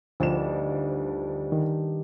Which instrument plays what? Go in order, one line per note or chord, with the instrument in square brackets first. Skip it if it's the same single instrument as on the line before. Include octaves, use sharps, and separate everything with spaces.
[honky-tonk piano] D2 F3 E7 [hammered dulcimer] G2 D3 D#3
[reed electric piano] D#3